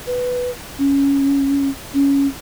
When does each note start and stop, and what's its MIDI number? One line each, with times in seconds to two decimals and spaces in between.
0.07 0.51 71
0.78 1.69 61
1.94 2.27 61